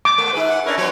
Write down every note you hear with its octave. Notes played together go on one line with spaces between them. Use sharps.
D6
G#3
D#4 G#4 B4
F#5
C#4 D4 E4 A#4
F3 B3 C#5